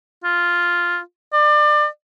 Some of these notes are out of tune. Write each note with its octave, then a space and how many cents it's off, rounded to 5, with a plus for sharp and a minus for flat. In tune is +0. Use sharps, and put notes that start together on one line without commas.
F4 +0
D5 +30